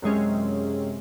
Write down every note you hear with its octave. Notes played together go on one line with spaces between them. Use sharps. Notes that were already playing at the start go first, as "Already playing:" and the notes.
F#2 C3 G#3 C#4